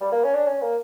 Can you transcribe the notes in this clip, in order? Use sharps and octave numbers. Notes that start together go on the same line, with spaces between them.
G3
A#3
C#4
D4
C#4
A#3